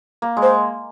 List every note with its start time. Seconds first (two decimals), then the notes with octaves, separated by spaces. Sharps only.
0.22 A#3
0.37 G#3
0.42 C5